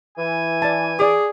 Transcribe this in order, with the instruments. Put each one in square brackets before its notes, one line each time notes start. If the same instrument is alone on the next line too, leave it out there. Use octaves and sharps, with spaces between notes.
[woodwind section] E3 [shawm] G#5
[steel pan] D5 A5
[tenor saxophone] G#4 [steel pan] D5 D6